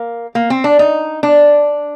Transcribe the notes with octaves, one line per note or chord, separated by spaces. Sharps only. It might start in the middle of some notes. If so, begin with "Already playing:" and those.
Already playing: A#3
A#3
C4
D4
D#4
D4